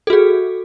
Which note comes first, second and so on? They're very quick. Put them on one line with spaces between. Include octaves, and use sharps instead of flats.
A4 F#4 G#4